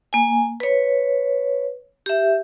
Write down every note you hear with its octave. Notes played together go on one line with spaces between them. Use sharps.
A#3 G#5
B4 C#5
G4 E5